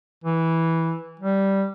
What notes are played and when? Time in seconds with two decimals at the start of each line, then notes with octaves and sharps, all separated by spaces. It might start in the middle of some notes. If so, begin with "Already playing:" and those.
0.24 E3
1.20 G3